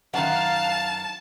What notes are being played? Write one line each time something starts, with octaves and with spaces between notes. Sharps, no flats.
F#2 D#3 F5 F#5 A5